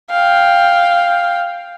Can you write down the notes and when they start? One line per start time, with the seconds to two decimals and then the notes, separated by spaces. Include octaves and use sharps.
0.10 F5 G5